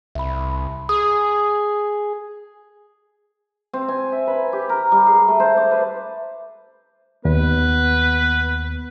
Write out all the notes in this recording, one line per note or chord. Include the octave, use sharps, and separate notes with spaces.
C2 E5 B5
G#4 D#6
C4
G#5
E5
B4
G4
A#4
G3
G#4
A3
C5
D5
B4
D#2 B3 B4